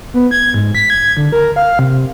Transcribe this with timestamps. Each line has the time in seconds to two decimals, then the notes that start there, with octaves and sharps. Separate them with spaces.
0.14 B3
0.31 G#6
0.54 G#2
0.75 B6
0.90 G#6
1.17 D3
1.32 A#4
1.56 F5
1.79 C3